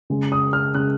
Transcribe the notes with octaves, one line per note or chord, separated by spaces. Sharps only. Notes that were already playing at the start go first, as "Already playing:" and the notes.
C#3 G#3
D#6
F6
C#3 G#3 F#6